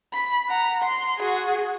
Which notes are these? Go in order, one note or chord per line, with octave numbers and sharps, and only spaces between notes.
B5
F#5 A#5
C6
F#4 G#4